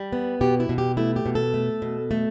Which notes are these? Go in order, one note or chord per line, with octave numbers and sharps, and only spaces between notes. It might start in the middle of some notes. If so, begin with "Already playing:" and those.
Already playing: G3
B3
B2 G4
E4
B2
G4
A3 E4
G4
B2
A4
A3
B2
A3